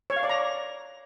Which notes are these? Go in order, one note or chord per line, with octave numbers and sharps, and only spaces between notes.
C#5
F5
D5
A#5